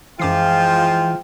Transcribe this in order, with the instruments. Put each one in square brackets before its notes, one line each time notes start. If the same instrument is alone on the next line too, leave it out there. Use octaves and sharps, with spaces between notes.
[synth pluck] F#2 D6 C7 [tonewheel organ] E3 [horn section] F3 G#3 F4 [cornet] G5